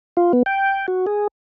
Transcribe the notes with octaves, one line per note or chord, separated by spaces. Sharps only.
F4
B3
G5
F#4
G#4